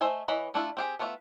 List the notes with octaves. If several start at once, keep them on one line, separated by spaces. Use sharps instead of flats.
A3 C5 D#5 E5 G#5
E3 B4 C#5 D#5 F#5
A3 D4 E4 F4
C4 G4 G#4
A3 B3 F4 C#5 E5